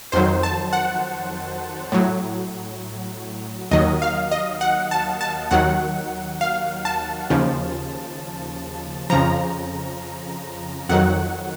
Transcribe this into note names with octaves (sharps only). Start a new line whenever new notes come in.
F2 D#3 F#3 C5
A5
F#5
A2 F#3
D#2 D#3 F#3 D#5
F5
D#5
F#5
A5
A5
D#2 D#3 F#3 F#5
F5
A5
D#2 C#3 F3
F2 C#3 F3 A#5
F2 D#3 F#3 F#5